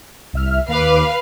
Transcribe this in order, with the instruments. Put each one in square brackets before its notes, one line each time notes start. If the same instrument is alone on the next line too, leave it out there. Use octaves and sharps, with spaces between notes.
[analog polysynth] C2 E5 F6
[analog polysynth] D#2 D6 [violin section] B4 F5